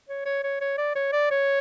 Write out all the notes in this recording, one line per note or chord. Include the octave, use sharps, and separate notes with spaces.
C#5
C#5
C#5
C#5
D5
C#5
D5
C#5